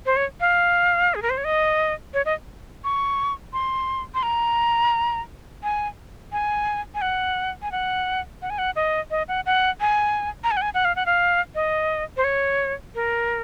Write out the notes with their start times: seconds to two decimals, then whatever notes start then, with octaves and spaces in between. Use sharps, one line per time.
0.06 C5
0.16 C#5
0.41 F5
1.15 G#4
1.22 A#4
1.30 C5
1.37 C#5
1.44 D#5
2.14 C#5
2.25 D#5
2.84 C#6
3.53 C6
4.15 C6
4.23 A#5
5.63 G#5
6.32 G#5
6.95 G#5
7.02 F#5
7.62 G#5
7.72 F#5
8.42 F#5
8.50 G#5
8.58 F#5
8.76 D#5
9.11 D#5
9.28 F#5
9.46 F#5
9.81 G#5
10.44 A#5
10.51 G#5
10.57 F#5
10.62 G#5
10.74 F#5
10.85 F5
10.96 F#5
11.06 F5
11.55 D#5
12.17 C5
12.24 C#5
12.95 A#4